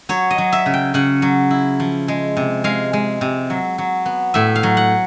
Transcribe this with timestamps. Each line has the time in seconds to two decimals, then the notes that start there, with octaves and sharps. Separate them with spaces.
0.09 F#3 C#5
0.30 D#5
0.38 F#3
0.52 E5
0.66 C#3
0.74 G5
0.94 C#3 F#5
1.22 F#3
1.51 E4
1.80 F3
2.08 G#3
2.37 C3
2.64 G#3 F5
2.93 G#3
3.21 C3
3.50 F#3
3.78 F#3
4.06 B3
4.34 A2 E5
4.55 F5
4.63 F#3
4.77 F#5